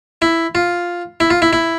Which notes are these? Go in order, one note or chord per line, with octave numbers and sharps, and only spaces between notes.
E4
F4
E4
F4
E4
E4